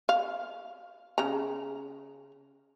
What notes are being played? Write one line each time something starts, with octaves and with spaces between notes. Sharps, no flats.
F5
C#3 A#5